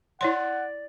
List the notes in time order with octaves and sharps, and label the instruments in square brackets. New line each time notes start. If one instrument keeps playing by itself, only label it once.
[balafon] E4 C#5 C6 [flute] D5 [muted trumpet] F#5